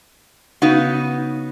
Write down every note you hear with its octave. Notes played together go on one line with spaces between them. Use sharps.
C#3 B3 D#4 F#4